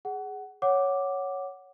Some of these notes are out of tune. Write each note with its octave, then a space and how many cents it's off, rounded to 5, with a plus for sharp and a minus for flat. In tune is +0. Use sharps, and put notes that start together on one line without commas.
G#4 +0 F#5 +20
C#5 +0 F#5 +0 D6 +0